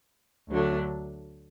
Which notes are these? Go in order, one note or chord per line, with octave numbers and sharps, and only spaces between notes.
D2 D3 F#3 A3 D4